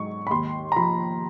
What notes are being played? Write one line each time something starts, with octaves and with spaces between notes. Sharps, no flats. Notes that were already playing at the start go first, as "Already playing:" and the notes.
Already playing: G#2 F#3 C#6
B5
D#2 C6
A#5
F3 B5